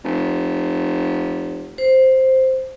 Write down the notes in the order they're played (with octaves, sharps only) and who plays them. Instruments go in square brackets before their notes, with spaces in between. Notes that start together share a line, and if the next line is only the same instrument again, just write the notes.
[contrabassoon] F1
[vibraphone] C5